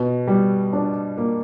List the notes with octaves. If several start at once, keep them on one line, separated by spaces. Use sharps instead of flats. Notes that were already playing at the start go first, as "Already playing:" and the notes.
Already playing: B2
G3
D4
A#3